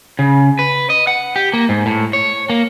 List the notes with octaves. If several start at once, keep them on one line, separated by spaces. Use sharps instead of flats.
C#3
B4
D#5
F#5
G4
A#3
G#2
A2
C#5
A#3